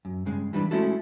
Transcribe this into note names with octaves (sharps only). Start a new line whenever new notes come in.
F#2
G2 C#3 G#3
E3 G3 D4 B4
G#3 A3 C#4 E4 F#4 A4